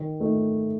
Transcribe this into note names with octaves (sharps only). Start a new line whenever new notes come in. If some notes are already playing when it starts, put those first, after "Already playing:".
Already playing: D#3
A3 D#4